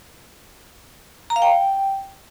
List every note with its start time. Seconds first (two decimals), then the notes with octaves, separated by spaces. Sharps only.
1.30 A#5
1.36 F5
1.42 G5